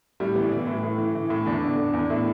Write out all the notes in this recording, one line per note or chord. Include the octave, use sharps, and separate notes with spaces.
A2 G3
E3 B3
E3 E4
A2
A2
E3
E3
A2
E2 D4
D3
D3
E2
A2 E4